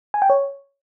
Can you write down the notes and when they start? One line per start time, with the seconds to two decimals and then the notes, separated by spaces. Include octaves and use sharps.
0.14 G#5
0.22 G5
0.30 C#5